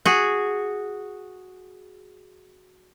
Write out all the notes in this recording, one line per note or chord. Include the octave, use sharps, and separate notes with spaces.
F#4 G#4